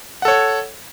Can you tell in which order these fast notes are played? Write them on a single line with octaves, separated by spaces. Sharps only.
F#5 A4 C#5